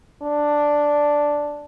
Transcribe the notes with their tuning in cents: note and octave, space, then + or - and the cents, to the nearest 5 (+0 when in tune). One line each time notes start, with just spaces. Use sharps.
D4 +0